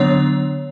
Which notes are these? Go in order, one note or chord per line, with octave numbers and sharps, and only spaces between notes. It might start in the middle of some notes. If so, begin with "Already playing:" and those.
Already playing: D3 F#3 B3 D4 C#5